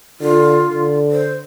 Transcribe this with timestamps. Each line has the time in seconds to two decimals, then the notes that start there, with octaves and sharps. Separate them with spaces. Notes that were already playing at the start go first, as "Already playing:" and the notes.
0.20 D3 F4
0.71 D3
1.11 C5